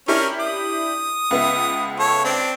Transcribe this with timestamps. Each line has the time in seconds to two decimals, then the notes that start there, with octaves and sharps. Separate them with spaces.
0.08 C#4 D4 E4 G4 A#4
0.40 D#6
1.31 C#2 B3 E5
1.99 A4 C#5
2.24 C4 D4